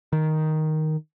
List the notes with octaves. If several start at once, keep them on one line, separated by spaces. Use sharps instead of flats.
D#3